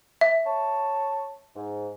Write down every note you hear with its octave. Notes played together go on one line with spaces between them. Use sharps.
E5
C#5 A5
G#2